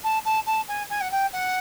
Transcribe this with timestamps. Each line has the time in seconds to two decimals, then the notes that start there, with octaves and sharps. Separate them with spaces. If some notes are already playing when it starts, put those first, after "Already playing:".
0.04 A5
0.25 A5
0.46 A5
0.68 G#5
0.90 G#5
1.01 F#5
1.11 G5
1.32 F#5